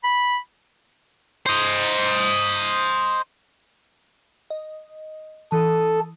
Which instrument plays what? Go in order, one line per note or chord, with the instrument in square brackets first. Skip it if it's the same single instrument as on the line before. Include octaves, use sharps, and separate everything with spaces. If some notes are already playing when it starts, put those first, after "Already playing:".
[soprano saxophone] B5
[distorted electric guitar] C5 D#5
[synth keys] D#5
[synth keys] E3 D#6 D#7 [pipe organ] A4